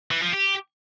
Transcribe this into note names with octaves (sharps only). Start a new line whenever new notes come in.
E3
F3
G4